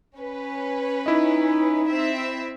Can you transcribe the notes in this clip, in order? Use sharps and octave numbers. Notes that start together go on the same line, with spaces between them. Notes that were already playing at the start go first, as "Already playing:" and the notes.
C#4 B4
D#4 E4 D#5
C4 E5